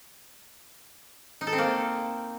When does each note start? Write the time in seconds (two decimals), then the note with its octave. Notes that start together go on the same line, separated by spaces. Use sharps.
1.41 D#4
1.47 A4
1.53 C4
1.58 A#3